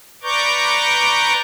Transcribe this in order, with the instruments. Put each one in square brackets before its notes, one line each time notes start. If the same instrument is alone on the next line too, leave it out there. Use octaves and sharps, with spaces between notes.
[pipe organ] B4 D5 A#5 C#6 D6 G6